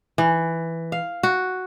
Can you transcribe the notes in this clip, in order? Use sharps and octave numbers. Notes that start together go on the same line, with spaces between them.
E3
F5
F#4